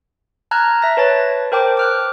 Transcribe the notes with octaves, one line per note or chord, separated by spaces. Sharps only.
A5 A#5 F6 F#6 G#6
E5 A#6
B4 C#5 A5 A6
A#4 C5 G5 A5 D6
D6 F6 F#6